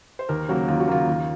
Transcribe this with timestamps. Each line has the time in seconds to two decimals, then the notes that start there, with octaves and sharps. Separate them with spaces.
0.19 C5
0.29 D#2 A#4
0.48 C#3 F#3 A#3 F#4
0.68 D#2 F4
0.80 F#4
0.87 C#3 F#3 A#3 F4
1.07 D#2